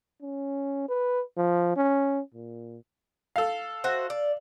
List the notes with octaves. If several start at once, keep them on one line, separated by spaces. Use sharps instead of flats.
C#4
B4
F3
C#4
A#2
A4 F5
F#4 C5 E5
D5